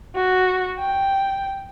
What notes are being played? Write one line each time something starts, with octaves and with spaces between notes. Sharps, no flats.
F#4
G5